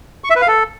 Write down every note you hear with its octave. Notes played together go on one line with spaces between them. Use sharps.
C#6
E5
B4
F5
A4